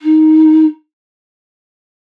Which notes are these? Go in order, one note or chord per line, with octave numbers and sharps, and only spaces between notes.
D#4